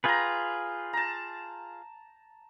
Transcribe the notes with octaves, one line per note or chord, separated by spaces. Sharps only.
F4 G#4 B4 G5 A#5
A5 A#5